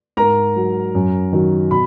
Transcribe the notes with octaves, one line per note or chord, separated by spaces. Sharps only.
G#2 A#4 A#5
F#3
F#2
D#3 F#3
B2 B5